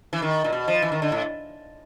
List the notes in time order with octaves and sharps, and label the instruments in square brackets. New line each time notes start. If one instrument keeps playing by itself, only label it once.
[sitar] E3
D#3
A#2
B2
F3
E3
D#3
D3
A2